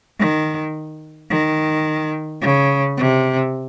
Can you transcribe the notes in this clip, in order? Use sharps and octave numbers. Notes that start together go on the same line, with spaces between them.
D#3
D#3
C#3
C3